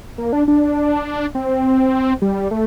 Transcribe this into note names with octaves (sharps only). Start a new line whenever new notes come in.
A#3
D4
D4
C4
G3
A3